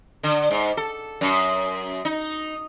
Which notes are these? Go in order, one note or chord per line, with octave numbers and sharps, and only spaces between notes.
D3
G#2
A4
F#2
D#4